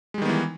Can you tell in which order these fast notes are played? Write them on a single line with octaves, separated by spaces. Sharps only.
G#3 G3 D#3 B3 E3